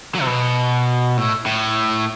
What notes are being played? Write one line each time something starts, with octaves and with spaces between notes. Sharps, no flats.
F#3
C3
B2
A2
A2